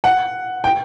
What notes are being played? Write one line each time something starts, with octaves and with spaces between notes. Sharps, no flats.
F#5
G5